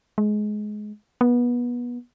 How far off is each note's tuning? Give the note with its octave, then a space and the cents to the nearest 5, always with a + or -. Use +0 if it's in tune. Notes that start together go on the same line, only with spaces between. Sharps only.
G#3 +20
B3 -25